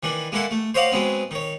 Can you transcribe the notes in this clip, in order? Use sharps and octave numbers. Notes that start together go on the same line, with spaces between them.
D#3 E3 D4
G#3 A#3 E4 A4 F#5
A3
C5 C#5 D#5 F5 F#5 D6
F#3 G#3 B3 C4
D#3 C#5